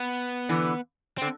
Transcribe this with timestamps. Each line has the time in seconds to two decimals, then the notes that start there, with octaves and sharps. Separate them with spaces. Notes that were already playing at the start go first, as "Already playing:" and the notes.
Already playing: B3
0.49 D3 E3
1.18 C4
1.22 D3